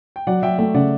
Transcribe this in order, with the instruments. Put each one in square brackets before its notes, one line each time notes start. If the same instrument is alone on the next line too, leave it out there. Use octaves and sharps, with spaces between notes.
[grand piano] G5
[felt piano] F#3 [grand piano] D5 F#5
[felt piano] F#3 [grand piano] E5 G5
[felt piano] A3 [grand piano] E5 G5
[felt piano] C#3 [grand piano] D5 F#5